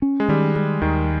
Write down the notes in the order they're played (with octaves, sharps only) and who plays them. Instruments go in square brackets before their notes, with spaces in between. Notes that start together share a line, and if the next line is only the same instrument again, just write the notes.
[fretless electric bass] C#4
[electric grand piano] G#3
[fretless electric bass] D#3 [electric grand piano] G3
[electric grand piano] G3 [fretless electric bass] G#3
[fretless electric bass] D#2 [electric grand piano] D#3